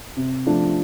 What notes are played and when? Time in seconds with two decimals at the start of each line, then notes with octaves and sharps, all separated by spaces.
0.17 C3
0.46 F3 A3 D4